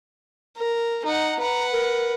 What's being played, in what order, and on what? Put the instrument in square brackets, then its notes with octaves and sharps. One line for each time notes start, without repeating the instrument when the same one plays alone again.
[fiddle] A#4
[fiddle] D#4 F#5 [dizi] A#5
[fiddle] B4 F#5 [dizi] A#5
[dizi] A#4